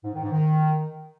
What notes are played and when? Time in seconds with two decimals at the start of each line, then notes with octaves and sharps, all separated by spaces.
0.04 G#2
0.13 D#3
0.23 G#2
0.32 D#3